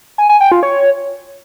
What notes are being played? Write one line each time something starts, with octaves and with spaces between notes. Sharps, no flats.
G#5
G#5
G5
F4
C#5